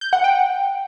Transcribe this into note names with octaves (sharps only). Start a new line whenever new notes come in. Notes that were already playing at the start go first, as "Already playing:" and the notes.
G6
F#5
G5